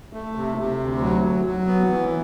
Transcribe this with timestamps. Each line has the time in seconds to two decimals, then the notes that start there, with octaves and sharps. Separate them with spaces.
0.13 A3
0.35 C3
0.58 C3
0.79 D2
1.01 F#3
1.24 F#3
1.45 F#3
1.67 B3
1.89 E3